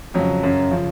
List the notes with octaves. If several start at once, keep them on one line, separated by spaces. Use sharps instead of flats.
F2 C#3 F#3
F#2 C#3
C#3 F3